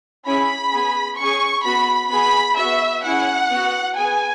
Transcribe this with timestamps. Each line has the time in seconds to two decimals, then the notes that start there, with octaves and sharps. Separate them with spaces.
0.25 C#4 E4 G#4 B5
0.72 B3 G#4
1.18 C#4 G#4 C#6
1.64 B3 F#4 B5
2.11 B3 G#4 B5
2.58 B3 F#4 E5
3.04 C#4 E4 G#4 F#5
3.51 B3 F#4
3.97 B3 G#4 G#5